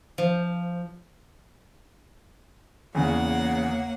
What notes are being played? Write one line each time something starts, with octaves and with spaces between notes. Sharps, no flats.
F3
E2 C#3 A#3 C#5 F#5